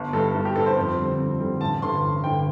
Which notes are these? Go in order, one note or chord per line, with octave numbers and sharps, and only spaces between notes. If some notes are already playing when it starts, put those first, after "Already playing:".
Already playing: G1
G2 G3 A4
G1
G4
G2 G3 A4
C5
F2 C5
D3 G3 C4
F2
D3 G3 C4
A1 A5
G2 D3 C6
A1
G2 D3 G5